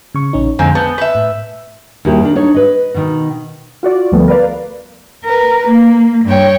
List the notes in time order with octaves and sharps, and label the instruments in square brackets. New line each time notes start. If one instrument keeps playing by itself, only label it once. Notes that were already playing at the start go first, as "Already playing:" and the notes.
[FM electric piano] C#3 C#6
A#1 C#4 D#4
[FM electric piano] F2 D3 [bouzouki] G#3 A#3 C4
[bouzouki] B3 [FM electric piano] A5 G6
[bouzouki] B4 E5
[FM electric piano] A2
[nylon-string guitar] D#2 G3 E4 G4
D#3 D4
D4 D#4 C#5
B4 D#5
B2 D#3 D#4
[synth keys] F4 F#4 D5
D2 F3 G3 A3 B3
A#4 B4 D5 F5
[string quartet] A#4 B4
A#3
G2 C#5 G5